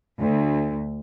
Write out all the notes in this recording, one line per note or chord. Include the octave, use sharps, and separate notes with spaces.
D2